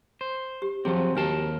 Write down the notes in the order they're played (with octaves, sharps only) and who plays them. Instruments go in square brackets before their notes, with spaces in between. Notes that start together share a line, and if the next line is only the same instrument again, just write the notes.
[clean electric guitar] C5
[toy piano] G4
[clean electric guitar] F3 F#3 C4 [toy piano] G4 G#4
[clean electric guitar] D#2 A#4 A5 [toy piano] D4 F#4 G4